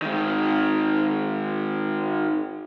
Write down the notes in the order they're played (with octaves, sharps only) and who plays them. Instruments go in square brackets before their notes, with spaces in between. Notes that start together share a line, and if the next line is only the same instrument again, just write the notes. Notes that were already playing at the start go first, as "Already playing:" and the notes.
[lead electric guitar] G#2 D#3